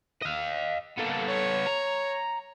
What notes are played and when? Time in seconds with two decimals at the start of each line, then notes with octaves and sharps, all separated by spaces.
0.22 D#5 F5
0.98 A#3 B3 A4
1.28 C#5
1.67 A#5